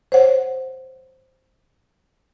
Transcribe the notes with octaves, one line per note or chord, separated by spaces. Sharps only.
C5 C#5 F#5